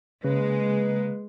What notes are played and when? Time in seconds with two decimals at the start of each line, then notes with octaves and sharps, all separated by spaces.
0.24 C#3 G#3 A#3 B4